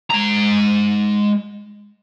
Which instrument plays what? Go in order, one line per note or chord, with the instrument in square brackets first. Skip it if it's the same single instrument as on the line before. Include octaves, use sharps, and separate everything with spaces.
[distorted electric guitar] G#3 A#5